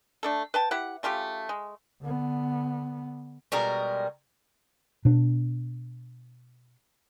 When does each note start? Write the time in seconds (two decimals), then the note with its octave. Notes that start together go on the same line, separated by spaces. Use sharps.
0.23 A3 D4 A4
0.54 B4 G5 A5
0.71 E4 G4 F#5
1.03 C#3 A3 F4 G4
1.49 G#3
2.02 D3 B3
3.52 B2 G3 G#3 A#4
5.05 B2 D4